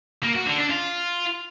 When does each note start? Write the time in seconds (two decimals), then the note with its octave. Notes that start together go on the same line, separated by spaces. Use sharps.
0.23 A#3
0.35 F#4
0.46 D3
0.58 D4
0.70 F4